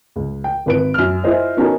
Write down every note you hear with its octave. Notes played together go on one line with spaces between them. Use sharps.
C#2
G5
G#1 B4 D7
F#2 F6
E4 F4 G#4 C5 D#5
B3 C#4 D#4 F#4 A4 A#4